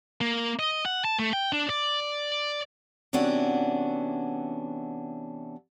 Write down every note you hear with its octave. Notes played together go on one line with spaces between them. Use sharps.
A#3
D#5
F#5
A5
A3
G5
D4
D5
C3 E3 B3 C#4 D4 F#4